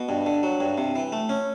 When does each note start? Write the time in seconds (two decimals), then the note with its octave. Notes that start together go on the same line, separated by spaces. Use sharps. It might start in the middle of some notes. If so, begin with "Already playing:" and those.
Already playing: B2
0.09 G2
0.26 D3
0.43 F#3
0.60 G2
0.78 C3
0.96 E3
1.12 A3
1.29 C#4